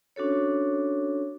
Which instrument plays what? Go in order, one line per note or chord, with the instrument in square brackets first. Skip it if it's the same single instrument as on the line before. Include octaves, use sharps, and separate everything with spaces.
[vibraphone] C#4 D4 F#4 A4 C#5